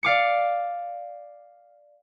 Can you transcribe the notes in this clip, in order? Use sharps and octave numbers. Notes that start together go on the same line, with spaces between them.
D5 F5 D6 C#7